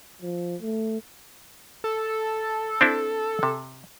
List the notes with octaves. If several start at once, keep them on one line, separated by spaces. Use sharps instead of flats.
F3
A3
A4
C4 D4 E4
C3